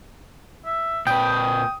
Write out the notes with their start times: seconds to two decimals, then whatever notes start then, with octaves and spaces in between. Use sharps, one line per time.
0.66 E5
1.07 A#2 B4 G5 D#6